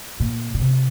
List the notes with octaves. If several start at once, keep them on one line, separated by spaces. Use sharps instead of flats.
A#2
A#2
C3